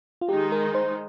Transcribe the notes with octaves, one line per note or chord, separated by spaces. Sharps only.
F4
D#3 G#3 D#4 G4
A#4
C5